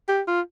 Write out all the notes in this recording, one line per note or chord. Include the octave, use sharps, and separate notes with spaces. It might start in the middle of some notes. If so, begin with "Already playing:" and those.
G4
F4